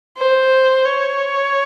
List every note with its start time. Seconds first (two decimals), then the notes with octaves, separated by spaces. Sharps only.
0.17 C5
0.86 C#5